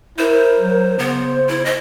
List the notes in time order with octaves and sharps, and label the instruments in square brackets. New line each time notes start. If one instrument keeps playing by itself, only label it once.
[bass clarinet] E4 [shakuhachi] A#4 [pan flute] C5
[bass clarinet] F#3
[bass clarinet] C#3 [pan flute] B3 [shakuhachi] C5
[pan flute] E4
D#5